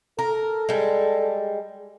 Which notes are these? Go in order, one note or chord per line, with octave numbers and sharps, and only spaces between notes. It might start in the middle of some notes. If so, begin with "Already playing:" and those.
A4 A#4
G3 G#3